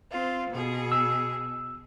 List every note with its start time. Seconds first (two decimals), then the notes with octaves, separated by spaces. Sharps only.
0.10 C4 F4
0.50 B2 G#4
0.92 E6